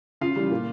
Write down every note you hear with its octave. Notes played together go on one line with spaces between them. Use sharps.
C#3 F4 F5
E3 G3
A#2